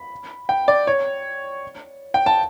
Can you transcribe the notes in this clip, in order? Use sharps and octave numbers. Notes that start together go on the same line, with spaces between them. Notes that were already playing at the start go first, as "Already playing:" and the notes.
Already playing: B5
G5
D5
C#5
G5
A5